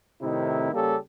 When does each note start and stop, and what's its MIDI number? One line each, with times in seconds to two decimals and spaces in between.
0.22 0.72 41
0.22 0.72 45
0.22 0.72 48
0.22 0.72 51
0.22 0.72 63
0.22 0.72 64
0.73 0.96 49
0.73 0.96 55
0.73 0.96 58
0.73 0.96 61
0.73 0.96 67
0.73 0.96 69